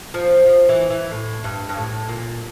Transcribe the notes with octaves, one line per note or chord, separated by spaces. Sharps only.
F3
F3
E3
E3
A2
G2
G2
A2
A#2